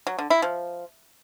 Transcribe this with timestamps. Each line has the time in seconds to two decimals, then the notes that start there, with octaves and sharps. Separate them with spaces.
0.07 F#3
0.19 D3
0.30 E4
0.42 F3